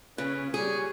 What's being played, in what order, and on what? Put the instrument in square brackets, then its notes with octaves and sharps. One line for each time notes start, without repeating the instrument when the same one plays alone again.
[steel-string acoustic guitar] C#3 [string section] C#4 [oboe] B4
[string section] G3 [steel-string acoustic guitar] G#4 [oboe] C#5